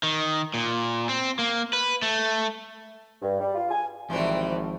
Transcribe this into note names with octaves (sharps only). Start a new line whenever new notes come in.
D#3
A#2
C4
A#3
B4
A3
G2
G3
F4
G#5
G#1 C3 E3 F3 G3 A3 C5